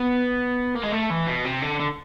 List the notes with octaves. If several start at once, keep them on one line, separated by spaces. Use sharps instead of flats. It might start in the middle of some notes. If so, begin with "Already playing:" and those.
Already playing: B3
A#3
G#3
A3
E3
B2
C3
D3
D3